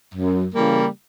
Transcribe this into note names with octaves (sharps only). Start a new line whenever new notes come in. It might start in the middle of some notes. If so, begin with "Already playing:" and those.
F#2
C#3 E3 G3 A#3